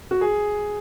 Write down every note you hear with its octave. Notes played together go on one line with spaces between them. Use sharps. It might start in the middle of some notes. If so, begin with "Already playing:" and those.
F#4
G#4